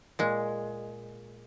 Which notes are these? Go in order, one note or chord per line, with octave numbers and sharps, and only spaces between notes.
A#2 G#3